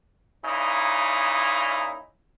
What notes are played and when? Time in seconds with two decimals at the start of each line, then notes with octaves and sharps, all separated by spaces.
0.44 A#2 C#3 D#4 E4